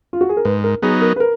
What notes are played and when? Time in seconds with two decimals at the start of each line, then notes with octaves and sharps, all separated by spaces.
0.13 F4
0.21 F#4
0.29 G#4
0.37 A#4
0.45 G#2 B4
0.64 A#4
0.82 F#3 B3 D#4 G#4
1.01 A#4
1.16 B4
1.20 A#4